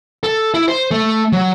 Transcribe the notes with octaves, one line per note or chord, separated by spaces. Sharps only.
A4
E4
C5
A3
F#3